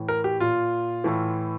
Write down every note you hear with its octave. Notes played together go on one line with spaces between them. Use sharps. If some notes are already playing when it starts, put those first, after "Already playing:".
Already playing: A2 E3
A#4
G4
A#2 F4
A2 E3